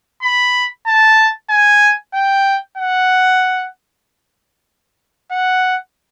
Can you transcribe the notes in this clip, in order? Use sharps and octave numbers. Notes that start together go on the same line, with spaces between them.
B5
A5
G#5
G5
F#5
F#5